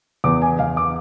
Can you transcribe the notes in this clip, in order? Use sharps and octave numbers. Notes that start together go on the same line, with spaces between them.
E2 D6
G#5
E2 F5
D6